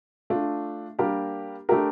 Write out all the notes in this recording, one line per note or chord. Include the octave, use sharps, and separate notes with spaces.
A3 D4 F4
G3 A#3 D4 G4 A#4
A3 D4 G4 A#4